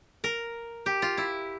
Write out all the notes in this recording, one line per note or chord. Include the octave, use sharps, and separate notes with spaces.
A#4
G4
F4
E4